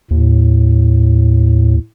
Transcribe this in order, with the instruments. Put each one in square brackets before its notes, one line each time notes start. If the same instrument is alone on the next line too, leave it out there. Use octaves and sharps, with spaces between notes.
[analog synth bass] D#2 [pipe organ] A2